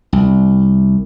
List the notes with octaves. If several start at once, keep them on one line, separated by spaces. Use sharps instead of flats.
C2